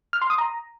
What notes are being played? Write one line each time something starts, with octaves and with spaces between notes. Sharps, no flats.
F6
C6
D#6
A#5